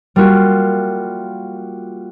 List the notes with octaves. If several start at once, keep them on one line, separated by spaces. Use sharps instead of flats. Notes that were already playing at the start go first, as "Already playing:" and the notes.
G3 A#3 F4 F#4